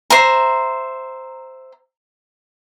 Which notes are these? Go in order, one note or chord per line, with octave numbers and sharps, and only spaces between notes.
C5 E5 A#5